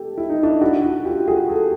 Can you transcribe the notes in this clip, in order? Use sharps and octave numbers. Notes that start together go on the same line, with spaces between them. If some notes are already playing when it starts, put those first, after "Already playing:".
Already playing: G4 A4
E4
D#4
D4 E4
E4 F#4
E4 F#4
F4 G4
F#4 G#4
G4 A4